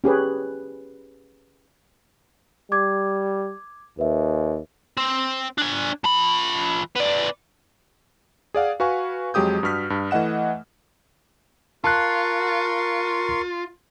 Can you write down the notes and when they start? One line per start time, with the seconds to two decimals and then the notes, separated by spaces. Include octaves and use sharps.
0.04 C#4 G4 G#4 B4
2.72 G3 D6 G#6
3.99 D#2 B4 E5
4.97 C4
5.58 D4 G#5
6.04 F3 B5
6.96 B3 D5
8.54 G#4 D5 F5 F#5
8.80 F#4 B4 F5 G#5 C#6
9.34 F2 F#3 G#3 G4 D#6 G6
9.63 G2 F#4 F6 B6
9.90 G2
10.11 E3 A3 D#5 F#5 E7
11.84 F4 A#4 A5 C6 C#6 F#6